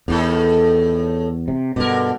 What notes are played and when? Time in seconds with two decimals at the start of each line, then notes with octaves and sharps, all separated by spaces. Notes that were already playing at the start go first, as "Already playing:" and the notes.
0.08 E2 A2 D#3 A4
1.48 C3
1.76 G2 B2 D3 A#4